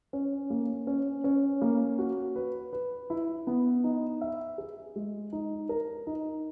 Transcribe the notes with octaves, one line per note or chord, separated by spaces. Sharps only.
C#4
A#3
C#4
C#4
A#3
F#4
B4
B4
E4
B3
D#4
E5
G#4
G#3
D#4
A#4
D#4